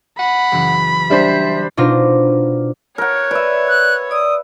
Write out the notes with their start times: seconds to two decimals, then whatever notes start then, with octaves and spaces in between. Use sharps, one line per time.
0.19 F#5 B5 D#7
0.52 F#1 E3
1.10 G3 D4 C5 E5
1.77 B2 D4 D#4 F4 C5 A#6
2.98 A#4 C#5 F#5
3.31 B4 D5 E5
3.68 F#6
4.11 D5 D#6 E6